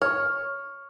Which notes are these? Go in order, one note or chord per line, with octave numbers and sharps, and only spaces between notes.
C#5 C#6 F6